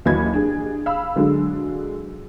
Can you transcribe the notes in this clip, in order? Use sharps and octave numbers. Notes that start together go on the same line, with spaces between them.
D#2 E3 F#3 D#5 B5 G#6
D4 G4 G#4
F5 B5 E6
D3 F#3 G#3 D4